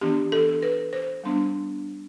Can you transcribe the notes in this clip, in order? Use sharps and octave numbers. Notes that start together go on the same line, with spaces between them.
E3 B3 D4 G4
A4
B4
C5
G3 B3 D4